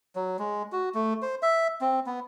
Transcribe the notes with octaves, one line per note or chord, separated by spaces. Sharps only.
F#3
G#3
F#4
A3
C5
E5
C4
B3